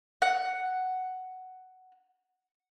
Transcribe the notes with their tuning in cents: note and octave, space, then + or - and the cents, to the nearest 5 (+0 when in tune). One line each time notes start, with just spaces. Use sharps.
F#5 +5